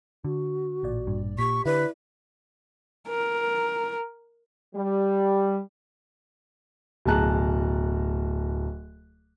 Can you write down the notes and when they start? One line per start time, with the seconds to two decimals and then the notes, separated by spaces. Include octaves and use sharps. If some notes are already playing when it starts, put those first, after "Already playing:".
0.24 D3 F#4
0.83 A1 A#2 D5
1.07 G2
1.39 A#2 G4 C#6 B6
1.65 D3 E4 B4 D5
3.08 A#4
4.76 G3
7.05 D1 B2 G#4 A5 A#5 F#6